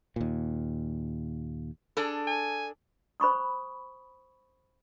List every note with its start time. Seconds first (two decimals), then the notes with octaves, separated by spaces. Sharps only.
0.16 D#2 A#2
1.97 D4 G#4 A4
2.27 G#5
3.20 C5 B5 C#6 D#6